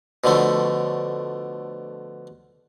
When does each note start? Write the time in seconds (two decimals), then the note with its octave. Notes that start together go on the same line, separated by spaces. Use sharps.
0.24 B2 D3 F3 A3